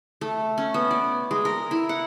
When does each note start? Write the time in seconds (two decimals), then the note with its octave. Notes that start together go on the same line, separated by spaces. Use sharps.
0.21 A3
0.58 C#4
0.74 B3
0.91 D5
1.31 G#3
1.45 A#4
1.71 E4
1.89 F#5